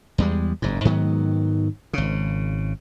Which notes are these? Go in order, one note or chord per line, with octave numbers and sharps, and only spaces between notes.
E2 G3 G#3
F#1 G#2
G#2 D#3 F#3 B3
G#1 C#3